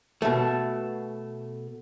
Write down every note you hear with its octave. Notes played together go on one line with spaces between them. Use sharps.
B2 A3